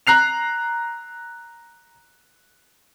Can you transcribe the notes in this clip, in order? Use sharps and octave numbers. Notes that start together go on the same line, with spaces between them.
A#5 F#6 C7 F7